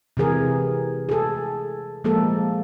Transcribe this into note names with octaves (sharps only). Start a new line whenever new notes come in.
C3 E3 G#4 A#4
G#4 A4
F3 G#3 A#3 A4